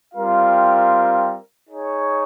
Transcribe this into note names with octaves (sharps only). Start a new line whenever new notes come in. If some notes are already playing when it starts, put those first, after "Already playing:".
G3 C4 F4 A#4 F5
D#4 G#4 C#5